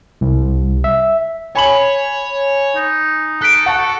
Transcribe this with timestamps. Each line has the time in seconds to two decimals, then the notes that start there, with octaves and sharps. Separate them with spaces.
0.21 C2
0.84 E5
1.55 C#5 G#5 B5 F#7
2.76 D#4
3.42 A4 F#6 B6 D7
3.66 F#4 F#5 A5